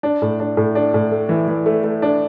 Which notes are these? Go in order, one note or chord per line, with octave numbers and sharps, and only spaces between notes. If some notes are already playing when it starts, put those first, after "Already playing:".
D4
A2
D4
A2
D4
A2
A3
E3
E3
A3
A3
D4